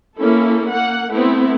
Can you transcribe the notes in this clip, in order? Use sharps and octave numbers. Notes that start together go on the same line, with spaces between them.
A#3 C#4 E4 A4
A#3 F#5
A3 B3 C4 E4